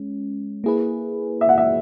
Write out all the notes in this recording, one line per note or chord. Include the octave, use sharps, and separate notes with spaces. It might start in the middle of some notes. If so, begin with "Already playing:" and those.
Already playing: G#3 C#4
A#3 E4 G#4 B4
E5
F#5
E5